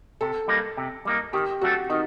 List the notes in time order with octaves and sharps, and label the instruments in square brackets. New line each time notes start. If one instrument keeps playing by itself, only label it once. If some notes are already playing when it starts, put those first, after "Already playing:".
[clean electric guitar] C3 [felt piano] A4
[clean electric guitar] G3 A#3 D#4
C3
G3 A#3 D#4
[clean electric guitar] D#3 [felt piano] G4
[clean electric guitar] F#3 A3 D4 A4 [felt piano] F#4
[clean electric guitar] D#3 [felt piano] D#4